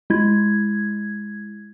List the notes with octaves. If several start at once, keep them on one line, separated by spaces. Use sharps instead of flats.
G#3 E4 G#6